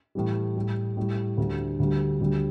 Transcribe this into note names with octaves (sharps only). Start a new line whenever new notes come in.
A2 E3 G3
A2 G3
A2 G3
D2 D3 G3
D2 D3 G3
D2 D3 G3